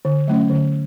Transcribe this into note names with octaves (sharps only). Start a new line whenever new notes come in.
D3
F#3 A3 C#4
D3